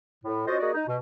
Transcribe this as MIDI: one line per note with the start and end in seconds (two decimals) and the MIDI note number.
0.24 0.45 45
0.47 0.59 61
0.47 0.59 65
0.47 0.59 66
0.47 0.59 72
0.47 0.59 75
0.60 0.71 58
0.60 0.71 66
0.60 0.71 68
0.60 0.71 74
0.60 0.71 75
0.74 0.84 63
0.87 0.96 47